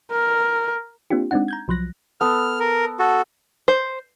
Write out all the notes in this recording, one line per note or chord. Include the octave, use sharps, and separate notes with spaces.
A#4
A#3 C4 D4 F4 G4
G#3 C4 D4 D#4 F#5
A#5 G6 G#6
C2 F3 F#3 F#6 A#6
B3 A4 F6
A#4
F#4 A4
C5